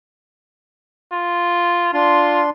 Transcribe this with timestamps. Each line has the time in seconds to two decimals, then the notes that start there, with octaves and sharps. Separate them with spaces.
1.12 F4
1.94 D4 F4 C6